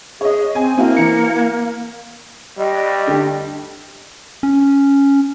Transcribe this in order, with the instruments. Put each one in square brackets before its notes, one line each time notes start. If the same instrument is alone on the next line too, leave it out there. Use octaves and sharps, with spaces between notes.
[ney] G#4 [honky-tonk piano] C#5 D#5
[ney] C4 [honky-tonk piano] G#5
[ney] A#3 [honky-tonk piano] C4 E4 F#4
[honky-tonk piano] E3 C#7
[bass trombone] G3 [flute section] D#5 G5
[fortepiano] D3 G4
[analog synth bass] C#4